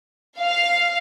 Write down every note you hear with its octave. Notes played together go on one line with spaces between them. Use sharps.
F5